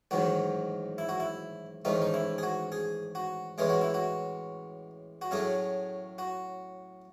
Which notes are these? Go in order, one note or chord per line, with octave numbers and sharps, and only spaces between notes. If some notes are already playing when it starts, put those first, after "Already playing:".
A1 G#2 D#3 F#3 F#4
E4
F#4
E4
A1 G#2 D#3 A3 C#4 D#4
D#4
E4
G#4
F#4
G#4
F#4
A2 E3 G#3 C#4 G#4
F#4
E4
F#4
F#4
A2 F#3 A3 C#4 G#4
F#4